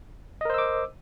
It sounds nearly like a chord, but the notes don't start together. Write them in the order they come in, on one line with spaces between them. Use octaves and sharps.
D#5 A#4 C5 E6 D6